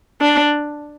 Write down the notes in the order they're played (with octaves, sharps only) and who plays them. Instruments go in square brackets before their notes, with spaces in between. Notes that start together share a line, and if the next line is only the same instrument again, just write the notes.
[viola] D4